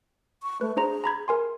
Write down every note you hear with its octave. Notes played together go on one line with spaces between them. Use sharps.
C#6
A3 B4
D4 G#4 C5 A#5
A#5 B5 G#6
A#4 G#5 C6